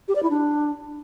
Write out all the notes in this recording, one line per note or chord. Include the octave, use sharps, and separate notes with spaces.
G4
D5
E4
D4